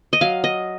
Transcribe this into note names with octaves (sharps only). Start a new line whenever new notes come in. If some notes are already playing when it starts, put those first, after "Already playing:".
D#5
F#3 F5
D#5